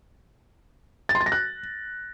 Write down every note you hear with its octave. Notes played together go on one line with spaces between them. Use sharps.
A6
C6
A6
A#6
F#6